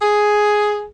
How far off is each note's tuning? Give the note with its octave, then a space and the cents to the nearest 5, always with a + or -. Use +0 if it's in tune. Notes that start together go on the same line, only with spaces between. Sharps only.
G#4 +5